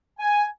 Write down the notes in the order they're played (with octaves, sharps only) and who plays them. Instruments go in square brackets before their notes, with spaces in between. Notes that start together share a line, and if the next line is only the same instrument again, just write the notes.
[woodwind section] G#5